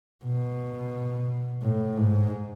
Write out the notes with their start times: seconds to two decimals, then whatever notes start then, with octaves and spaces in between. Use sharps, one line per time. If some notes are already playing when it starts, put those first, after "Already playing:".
0.25 B2
1.62 A2
1.97 G#2